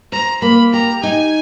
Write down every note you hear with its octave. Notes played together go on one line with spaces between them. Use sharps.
C5 A#5
A#3 B5
G4 A#5
D#4 G#5